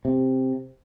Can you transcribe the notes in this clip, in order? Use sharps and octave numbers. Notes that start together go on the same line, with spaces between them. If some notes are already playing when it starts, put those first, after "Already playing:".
C3